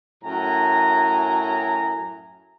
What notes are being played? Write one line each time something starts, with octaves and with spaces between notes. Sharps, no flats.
F#2 A2 G#5 A#5